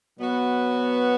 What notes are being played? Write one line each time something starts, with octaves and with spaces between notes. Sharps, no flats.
B2 F#3 B3 F#4